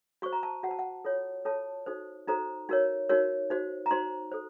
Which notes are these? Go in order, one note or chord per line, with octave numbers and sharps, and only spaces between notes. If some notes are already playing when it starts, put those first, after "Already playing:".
F#4 C5 C#6
A#5
A5
F#4 F#5
C5 A5
F#5
F4 A4 C#5
F4 A4 C#5 A5
D#4 F#4 A4 C5
D#4 F#4 A4 C5 A#5
D#4 F#4 A#4 C#5
D#4 F#4 A#4 C#5
D#4 F#4 C5
A#5
D#4 F#4 C5 C6
A4 C5